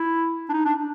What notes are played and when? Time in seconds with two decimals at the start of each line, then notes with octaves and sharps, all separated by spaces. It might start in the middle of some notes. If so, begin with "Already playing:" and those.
Already playing: E4
0.49 D4
0.53 D#4
0.65 D4